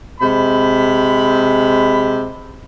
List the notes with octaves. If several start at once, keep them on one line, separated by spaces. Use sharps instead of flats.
C3 G#3 B5